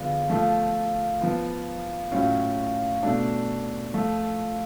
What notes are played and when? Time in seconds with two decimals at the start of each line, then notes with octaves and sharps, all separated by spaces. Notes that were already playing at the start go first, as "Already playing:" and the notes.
Already playing: D3 F3 G#3 B3 F4
0.30 F3 A3 F4
1.21 F3 B3 F4
2.12 A2 F#3 C#4 F4
3.03 B2 A3 D4
3.94 F3 A3 F4